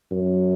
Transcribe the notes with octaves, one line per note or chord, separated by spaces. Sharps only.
F#2